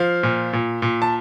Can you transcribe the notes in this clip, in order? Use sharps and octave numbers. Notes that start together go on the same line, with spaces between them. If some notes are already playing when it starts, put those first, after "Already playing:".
Already playing: F3 F5
A#2
A#2
A#2
A5